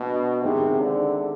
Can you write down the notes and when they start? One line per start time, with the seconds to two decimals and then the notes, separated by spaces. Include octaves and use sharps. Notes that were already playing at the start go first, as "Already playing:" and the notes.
Already playing: B2 B3 D4
0.42 C3 D#3 G#3 C4
0.81 D3